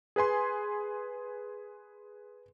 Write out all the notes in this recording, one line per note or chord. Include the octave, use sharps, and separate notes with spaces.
G#4 B4 G#5 C6